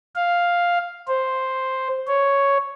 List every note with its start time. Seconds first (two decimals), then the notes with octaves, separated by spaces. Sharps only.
0.15 F5
1.08 C5
2.07 C#5